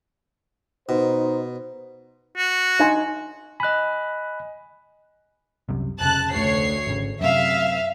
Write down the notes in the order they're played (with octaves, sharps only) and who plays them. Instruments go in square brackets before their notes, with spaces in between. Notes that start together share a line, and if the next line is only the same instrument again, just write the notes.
[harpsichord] B2 [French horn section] D#4 C5
[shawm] F#4
[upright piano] D#4 G#5 C6
[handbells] D#5 G#5 [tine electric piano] B5 F#6
[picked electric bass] C2 F#2 C3
[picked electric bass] F1 C#3 [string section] A5 F#6
[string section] D2 C#5 C7
[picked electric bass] G#1 C#3
[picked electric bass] F#2 C3 [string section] E5 F5